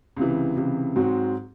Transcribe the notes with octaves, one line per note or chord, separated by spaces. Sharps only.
C#2 C3 E3
C#2 C3 E3
G#2 F#3 C4 F#4